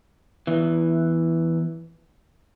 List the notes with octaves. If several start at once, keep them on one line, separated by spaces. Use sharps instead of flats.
E2 E3